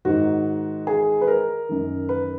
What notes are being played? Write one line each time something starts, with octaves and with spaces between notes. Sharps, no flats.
G#2 D#3 F#4
G#4
B4
A#4
F#2 D#3
B4